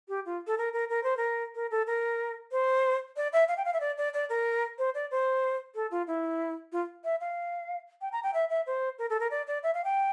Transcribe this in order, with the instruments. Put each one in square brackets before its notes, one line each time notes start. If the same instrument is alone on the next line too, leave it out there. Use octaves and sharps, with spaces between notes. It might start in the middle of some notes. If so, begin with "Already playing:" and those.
[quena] G4
F4
A4
A#4
A#4
A#4
C5
A#4
A#4
A4
A#4
C5
D5
E5
F5
G5
F5
E5
D5
D5
D5
A#4
C5
D5
C5
A4
F4
E4
F4
E5
F5
G5
A#5
G5
E5
E5
C5
A#4
A4
A#4
D5
D5
E5
F5
G5